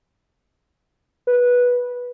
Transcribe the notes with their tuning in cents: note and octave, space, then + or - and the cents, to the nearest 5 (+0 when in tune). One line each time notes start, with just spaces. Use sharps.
B4 -10